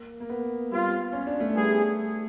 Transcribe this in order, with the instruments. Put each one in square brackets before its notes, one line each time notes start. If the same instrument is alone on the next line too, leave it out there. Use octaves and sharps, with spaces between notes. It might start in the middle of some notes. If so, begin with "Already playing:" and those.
Already playing: [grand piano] A#3
A#3
B3
[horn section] G3 C4 F4
[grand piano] C#4
D4
A3
[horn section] G3 B3 E4 G#4